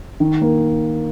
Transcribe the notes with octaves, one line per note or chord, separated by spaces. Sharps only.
D#3
A#3